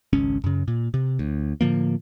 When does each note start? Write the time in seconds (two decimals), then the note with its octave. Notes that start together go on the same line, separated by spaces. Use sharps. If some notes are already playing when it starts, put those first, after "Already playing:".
0.13 G#1 C#2 C#4
0.44 F#2 C#3
0.68 A#2
0.94 C3
1.19 D2
1.61 A2 D3 F3 A#3